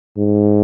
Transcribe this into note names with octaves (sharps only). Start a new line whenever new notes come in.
G#2